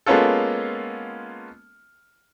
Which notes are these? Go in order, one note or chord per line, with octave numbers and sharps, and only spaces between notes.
G#3 A#3 B3 C#4 F4 A4